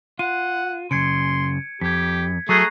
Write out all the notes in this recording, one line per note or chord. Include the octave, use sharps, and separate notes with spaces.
F4 F#5 D#7
F#2 C#3 C6 G#6 C#7 D7
F2 G4 G#6 B6
F#3 A3 G#4 A#5 C#6 F#6 C7